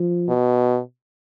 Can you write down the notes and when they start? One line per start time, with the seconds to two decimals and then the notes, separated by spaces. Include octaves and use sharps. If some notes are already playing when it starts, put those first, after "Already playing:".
Already playing: F3
0.29 B2